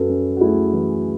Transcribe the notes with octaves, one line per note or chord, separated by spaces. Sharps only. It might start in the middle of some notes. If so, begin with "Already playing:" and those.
Already playing: F#2 F#4 A4 B4
C#4
F#4
A3 E4 G#4
E3